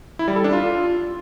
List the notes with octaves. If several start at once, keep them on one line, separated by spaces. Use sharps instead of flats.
E4
G3
A4
D4
F4